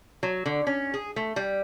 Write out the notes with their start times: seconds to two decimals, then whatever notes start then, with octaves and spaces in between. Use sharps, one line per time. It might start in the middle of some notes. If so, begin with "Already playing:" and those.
0.23 F#3
0.46 D3
0.67 C#4
0.94 G#4
1.16 A3
1.36 G3